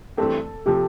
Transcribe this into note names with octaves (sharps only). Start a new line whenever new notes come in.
G2 E3 A3 C4 G4 A4
C3 F3 G4